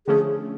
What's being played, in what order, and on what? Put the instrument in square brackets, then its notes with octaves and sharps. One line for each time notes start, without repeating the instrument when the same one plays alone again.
[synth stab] D3 F3 A3 C#4 [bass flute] G#4